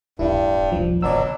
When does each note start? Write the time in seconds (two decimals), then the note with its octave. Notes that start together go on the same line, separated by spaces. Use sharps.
0.19 D1 G2 E4
0.72 D#1 A1 F3
1.02 B2 D3 F#3 D4 D5 E6